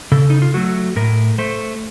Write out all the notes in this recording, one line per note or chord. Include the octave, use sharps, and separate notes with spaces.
C#3 A4
D#4
F4
F#3 A3 F#4
A2 A#4
A3 C5